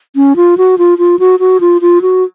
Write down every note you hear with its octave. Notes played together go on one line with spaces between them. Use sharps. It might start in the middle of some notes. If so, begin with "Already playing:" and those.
C#4
F4
F#4
F4
F4
F#4
F#4
F4
F4
F#4